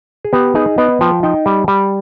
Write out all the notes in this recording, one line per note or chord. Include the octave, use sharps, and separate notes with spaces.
G#4
B3 G4
D#4 G#4
B3 D#5
F3 G5
D#4 G5
G3
G3